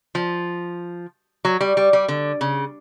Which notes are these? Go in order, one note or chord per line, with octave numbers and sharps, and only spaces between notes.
F3
F#3
G3
G3
G3
D3
C#3